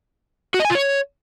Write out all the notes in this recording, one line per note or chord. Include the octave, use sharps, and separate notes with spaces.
F#4
D#5
G#5
F4
C#5